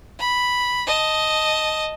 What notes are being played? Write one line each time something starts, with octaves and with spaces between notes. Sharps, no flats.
B5
D#5 A5